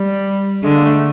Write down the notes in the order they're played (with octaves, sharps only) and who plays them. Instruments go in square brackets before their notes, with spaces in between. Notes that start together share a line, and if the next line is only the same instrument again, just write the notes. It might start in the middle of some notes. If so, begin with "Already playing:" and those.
Already playing: [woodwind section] G3
[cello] D3 [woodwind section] G#3
[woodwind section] A#3
A3